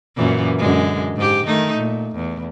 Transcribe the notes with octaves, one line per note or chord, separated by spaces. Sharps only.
F#2 A#2 E3
F#2 D3 G#3
G#2 G4
D#3 A3 D#4
A#2
E2